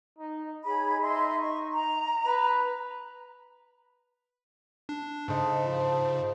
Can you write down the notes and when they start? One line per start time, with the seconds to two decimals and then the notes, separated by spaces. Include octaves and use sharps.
0.19 D#4
0.65 D#4 G#4 C#5 B5
1.00 D#5 E5 C6
1.37 C#6
1.73 A#5
2.25 B4
4.89 D4
5.28 G#2 C#3 A4 C5 D#5
5.66 F3